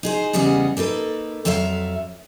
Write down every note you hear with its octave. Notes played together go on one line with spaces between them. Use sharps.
D#4 G#4 C5
E2 C#3 G3 B3 G#4 D#5
A#3 D#4 A4 B4
F2 F#3 A4 E5 F5